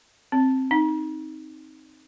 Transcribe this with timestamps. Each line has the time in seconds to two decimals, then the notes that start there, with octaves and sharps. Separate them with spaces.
0.32 C4
0.71 D#4